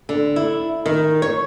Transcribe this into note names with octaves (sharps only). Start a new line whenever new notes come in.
D3
E4
D#3
C#5